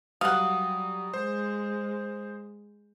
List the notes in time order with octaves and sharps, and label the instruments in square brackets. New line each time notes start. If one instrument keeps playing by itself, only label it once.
[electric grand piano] F#3 G3 [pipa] F5 F#5 [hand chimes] D#6
[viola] G#3 [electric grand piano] C5